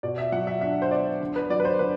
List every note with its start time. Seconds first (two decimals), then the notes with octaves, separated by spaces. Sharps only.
0.03 B2 D5
0.18 E5
0.32 F#3 F#5
0.47 E5
0.61 D4 E5
0.82 C5
0.91 B3 D5
1.21 D3
1.36 B4
1.50 F#3 D5
1.60 B4
1.65 C5
1.79 D3 B4